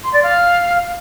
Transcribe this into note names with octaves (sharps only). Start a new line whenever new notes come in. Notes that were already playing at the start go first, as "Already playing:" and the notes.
C6
D5
F5